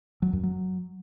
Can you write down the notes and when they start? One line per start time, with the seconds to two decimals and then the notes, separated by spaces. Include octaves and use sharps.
0.22 F#3
0.33 F#2
0.43 F#3